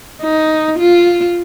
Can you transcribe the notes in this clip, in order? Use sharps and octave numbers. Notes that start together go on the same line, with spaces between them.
D#4
F4